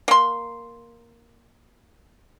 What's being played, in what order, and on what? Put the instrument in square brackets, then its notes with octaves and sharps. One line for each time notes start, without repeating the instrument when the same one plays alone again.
[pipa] A#3 C6